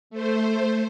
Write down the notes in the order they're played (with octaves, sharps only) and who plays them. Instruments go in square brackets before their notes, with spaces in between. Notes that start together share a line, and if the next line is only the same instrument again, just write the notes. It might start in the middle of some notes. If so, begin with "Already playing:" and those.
[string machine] A3 C5